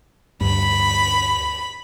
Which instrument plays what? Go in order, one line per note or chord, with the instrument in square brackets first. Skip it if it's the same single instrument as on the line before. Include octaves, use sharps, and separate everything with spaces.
[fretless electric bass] D2 G2 [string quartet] B5